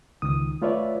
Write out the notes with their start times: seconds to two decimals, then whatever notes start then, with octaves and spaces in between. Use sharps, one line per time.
0.22 C#2 D#3 D#6
0.62 A3 F4 B4 C#5 D5 E5